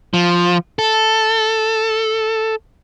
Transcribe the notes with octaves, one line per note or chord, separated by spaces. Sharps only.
F3
A4